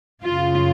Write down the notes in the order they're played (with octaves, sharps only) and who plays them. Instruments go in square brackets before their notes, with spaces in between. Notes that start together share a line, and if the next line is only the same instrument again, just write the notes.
[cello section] F#2 C#3 F4